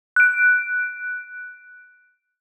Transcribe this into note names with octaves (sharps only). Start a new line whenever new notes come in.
F#6 D7